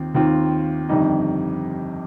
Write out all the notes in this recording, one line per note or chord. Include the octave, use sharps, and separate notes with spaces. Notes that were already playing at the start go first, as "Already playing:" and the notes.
Already playing: D#2 D#3 C4 F4
D#2 D#3 C4 F4
G1 F2 D#3 G3 D#4